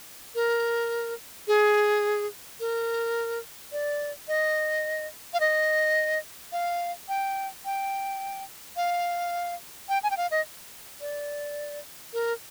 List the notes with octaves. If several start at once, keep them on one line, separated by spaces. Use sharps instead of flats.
A#4
G#4
A#4
D5
D#5
F5
D#5
F5
G5
G5
F5
G5
G#5
G5
F5
D#5
D5
A#4